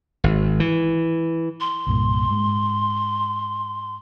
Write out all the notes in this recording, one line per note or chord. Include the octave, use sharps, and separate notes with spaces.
G#1
E3
C6
C2 G2 A#2
G#2